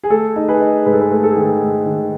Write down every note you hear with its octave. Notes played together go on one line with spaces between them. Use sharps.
G#4
A3 A4
D#4
G#4 B4
D#4
G#2 B4
A4
G#4 B4
A3
A4
D#3 G#4
A4
G#2
D#3